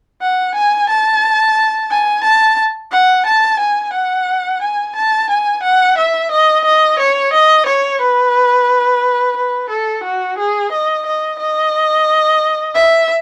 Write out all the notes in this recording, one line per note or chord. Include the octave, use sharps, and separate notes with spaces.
F#5
G#5
A5
G#5
A5
F#5
A5
G#5
F#5
G#5
A5
G#5
F#5
E5
D#5
D#5
C#5
D#5
C#5
B4
B4
A4
F#4
G#4
D#5
D#5
D#5
E5